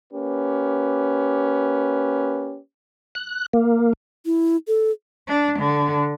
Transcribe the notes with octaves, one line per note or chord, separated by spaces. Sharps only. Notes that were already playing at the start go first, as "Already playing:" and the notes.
A#3 C#4 G4 B4
F#6
A#3
E4
A4
D4
D3